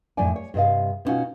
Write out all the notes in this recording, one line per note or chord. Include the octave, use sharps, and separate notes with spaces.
F2 A2 D#3 F#3 D5 G#5
C#5
G2 C3 D#5 F5
B2 B3 C#4 D#4 F4 F#4